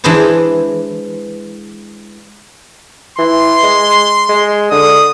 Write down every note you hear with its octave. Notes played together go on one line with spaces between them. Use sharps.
E3 G#3 D4 G#4 B4 C5
E3 C6
G#3
G#3
D3 D#6